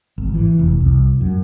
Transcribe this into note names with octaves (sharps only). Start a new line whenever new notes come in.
G#1
E3
F1
C2
F#2